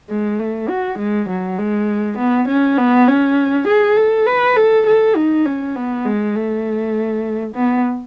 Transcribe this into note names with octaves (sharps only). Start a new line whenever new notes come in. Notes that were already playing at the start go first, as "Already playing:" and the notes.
G#3
A3
F#4
G#3
F#3
G#3
B3
C#4
B3
C#4
G#4
A4
B4
A4
A4
D#4
C#4
B3
G#3
A3
B3